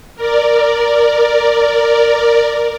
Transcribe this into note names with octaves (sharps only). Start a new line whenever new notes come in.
A#4 D5